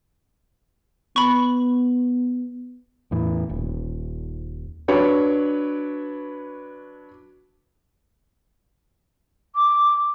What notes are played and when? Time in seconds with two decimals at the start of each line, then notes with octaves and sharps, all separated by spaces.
1.16 B3 B5 C#6
3.11 E2 A2 E3
3.49 D#1
4.88 F#3 D4 B4 C#5
9.56 D6